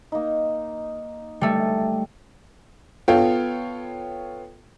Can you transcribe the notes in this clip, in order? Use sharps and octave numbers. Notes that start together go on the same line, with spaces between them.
A#3 D#4
G3 A3
B3 F4 A4 C#5 F5 G5